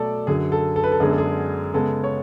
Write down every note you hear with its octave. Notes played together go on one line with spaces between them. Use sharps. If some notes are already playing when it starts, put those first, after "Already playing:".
Already playing: B2 F#3 A3 A4 D5
F#2 D3 F#3 G#4
A4
A4
B4
A4
F#2 D3 G#3 B3 D4 G#4
A4
G#4
C#3 G#3 B3 A4
C#5